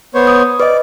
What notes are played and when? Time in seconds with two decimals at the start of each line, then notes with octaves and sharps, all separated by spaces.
0.14 B3 C5 C#5
0.27 D#6
0.60 B4 D5 D#5